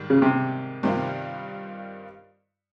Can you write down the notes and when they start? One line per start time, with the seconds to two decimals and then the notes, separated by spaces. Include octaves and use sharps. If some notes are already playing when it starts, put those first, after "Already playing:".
Already playing: G#2 D#3 G3
0.10 C#3
0.22 C3
0.83 G2 C3 D#3 G3 C4 F4